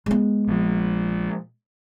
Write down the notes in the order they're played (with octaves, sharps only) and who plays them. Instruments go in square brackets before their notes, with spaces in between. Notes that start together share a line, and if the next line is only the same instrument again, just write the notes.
[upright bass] G#3 B3
[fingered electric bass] A#1 F3